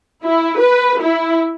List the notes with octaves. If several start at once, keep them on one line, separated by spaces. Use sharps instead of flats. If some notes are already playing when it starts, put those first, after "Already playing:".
E4
B4
E4